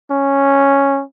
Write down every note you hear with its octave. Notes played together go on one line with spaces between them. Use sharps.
C#4